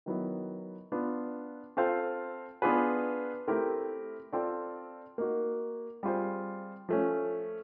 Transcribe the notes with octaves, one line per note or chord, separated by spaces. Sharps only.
D#3 F#3 B3 E4
B3 D4 F4
C4 F4 A4 C5 F5
B3 D4 F4 G#4 B4
A3 C4 E4 G4 A#4
C4 F4 A4 D5
A#3 D#4 F#4
G3 C4 F4 G#4 C5
F3 A3 C#4